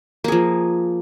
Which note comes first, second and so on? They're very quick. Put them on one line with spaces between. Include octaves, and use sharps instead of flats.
A#3 G#4 F3